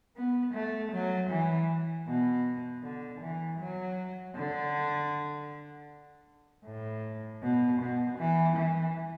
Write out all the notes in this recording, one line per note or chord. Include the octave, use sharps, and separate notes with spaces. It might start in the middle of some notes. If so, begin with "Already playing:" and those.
B3
A3
F#3
E3
B2
D3
E3
F#3
D3
A2
B2
B2
E3
E3